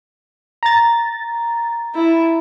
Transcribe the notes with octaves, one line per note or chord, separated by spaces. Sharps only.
A#5 A6
E4